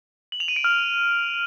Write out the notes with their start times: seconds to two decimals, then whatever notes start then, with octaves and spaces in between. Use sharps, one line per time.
0.32 F#7
0.40 F7
0.48 D#7
0.56 D7
0.64 F6